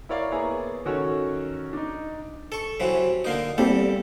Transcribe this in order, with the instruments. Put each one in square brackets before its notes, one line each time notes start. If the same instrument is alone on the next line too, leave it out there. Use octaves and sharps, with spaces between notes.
[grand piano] E4 A#4 C#5 D5 F5
A#3 B3 E4 G#4 C#5 A#5
D#3 C#4 F#4 A4 C#5
D4 D#4
[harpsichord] A4 C#6
C3 E3 F#3
D3 A#3 D#4
[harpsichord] E2 G3 A4 [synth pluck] A#3 C4 G4